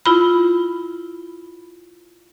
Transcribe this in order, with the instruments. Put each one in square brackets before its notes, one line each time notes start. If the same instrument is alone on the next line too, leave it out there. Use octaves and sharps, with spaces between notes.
[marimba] E4 F4 B5